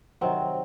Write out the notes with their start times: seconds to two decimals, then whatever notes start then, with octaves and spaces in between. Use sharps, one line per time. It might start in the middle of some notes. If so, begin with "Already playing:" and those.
0.21 C3 D#3 F#3 C4